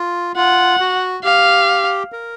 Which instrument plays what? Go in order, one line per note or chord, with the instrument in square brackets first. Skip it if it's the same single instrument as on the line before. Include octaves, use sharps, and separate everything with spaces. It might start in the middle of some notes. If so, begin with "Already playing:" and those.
Already playing: [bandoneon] F4
[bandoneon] F4 [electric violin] F#5
[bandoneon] F#4
[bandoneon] G4 [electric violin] F5
[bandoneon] A#4